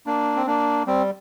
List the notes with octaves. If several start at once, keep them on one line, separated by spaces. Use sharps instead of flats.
A#3 D4
C4
A#3 D4
G3 C4